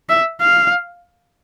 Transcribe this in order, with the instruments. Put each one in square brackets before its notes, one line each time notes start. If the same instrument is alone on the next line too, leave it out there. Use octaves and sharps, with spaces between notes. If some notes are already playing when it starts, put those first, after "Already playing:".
[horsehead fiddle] E5
F5